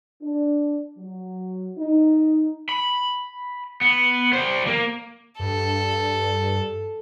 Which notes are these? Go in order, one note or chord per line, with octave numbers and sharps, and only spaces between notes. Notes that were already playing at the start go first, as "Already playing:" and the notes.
D4
F#3
D#4
B5
B3
G3 C5
A#3
G2 A4